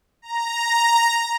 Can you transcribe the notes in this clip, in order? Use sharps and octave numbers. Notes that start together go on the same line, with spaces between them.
A#5